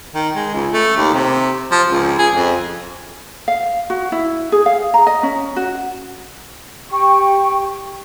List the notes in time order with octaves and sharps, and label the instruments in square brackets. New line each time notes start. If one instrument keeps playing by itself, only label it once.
[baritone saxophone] D#3
G#3
C#2
A3
D#2
C3
F3
C#2
G#4
F2
[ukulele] F5
F#4
E4
G#4
F5
A#5
D#5
C#4
F#4
[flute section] G4 G5 C#6